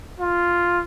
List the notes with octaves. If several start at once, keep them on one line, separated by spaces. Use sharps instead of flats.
F4